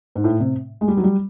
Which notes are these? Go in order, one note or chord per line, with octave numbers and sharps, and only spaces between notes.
G#2
A2
C3
G#3
G3
F#3
G3